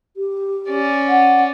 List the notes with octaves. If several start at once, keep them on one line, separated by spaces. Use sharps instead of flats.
G4
C#4 D5
F#5